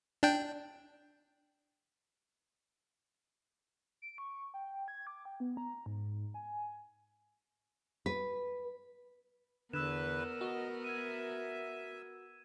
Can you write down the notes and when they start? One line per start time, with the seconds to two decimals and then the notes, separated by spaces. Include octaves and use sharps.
0.23 D4 G5
4.02 D7
4.18 C#6
4.54 G5
4.88 G#6
5.07 D6
5.25 G5
5.40 B3
5.57 A#5
5.86 G#2
6.34 G#5
8.06 B4
9.73 E2 D3 B3 A#4 B4 E6 E7
10.41 F#4 D#5
10.84 E5 G#6 D#7